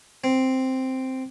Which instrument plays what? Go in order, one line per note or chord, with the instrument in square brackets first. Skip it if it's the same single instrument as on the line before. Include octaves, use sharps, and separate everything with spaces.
[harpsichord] C4